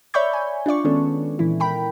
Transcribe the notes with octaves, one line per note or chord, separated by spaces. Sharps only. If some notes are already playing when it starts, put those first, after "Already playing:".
C#5 D5 E5 B5 C#6 G6
G#5
D4 F4 D5 C#6
D#3 G#3 B3 C#4 D4 A4
A#2 E3 E4
A#4 G5 B5